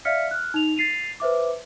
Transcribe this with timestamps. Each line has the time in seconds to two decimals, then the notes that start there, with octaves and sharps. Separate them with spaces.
0.05 D5 E5 F5 F6 B6 C#7
0.31 F6 F#6
0.54 D#4 F7
0.76 A6 C7 D#7 F7
1.20 B4 C5 E5 D6